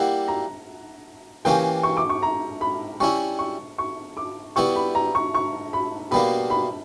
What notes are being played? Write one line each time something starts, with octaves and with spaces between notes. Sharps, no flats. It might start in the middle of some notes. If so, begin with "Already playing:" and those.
Already playing: G3 A#3 E4 G4 F#5
A#5
E3 A#3 C#4 G4 G5
C#6
D6
C#6
A#5
B5
G3 C#4 E4 C#6
C#6
C#6
D6
G3 B3 E4 G4 C#6
B5
A#5
C#6
C#6
B5
B2 G3 A#3 B5
B5